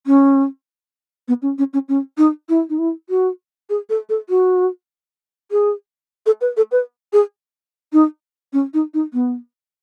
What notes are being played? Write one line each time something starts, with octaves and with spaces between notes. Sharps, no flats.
C#4
B3
C#4
C#4
C#4
C#4
D#4
E4
D#4
E4
F#4
G#4
A4
A4
F#4
G#4
A4
B4
A4
B4
G#4
D#4
C#4
D#4
D#4
B3